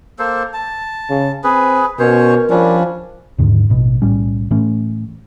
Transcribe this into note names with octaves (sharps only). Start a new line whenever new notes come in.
A#3 A4 C5
A5
C#3
C4 G#4 B4
B2 C#4 A#4 C5 C#5
F3 G3 C#4 D4
D#2 G#2 D3 D#3
A1 B2
B1 A2 G3 C#4
A2 E3 A3 C#4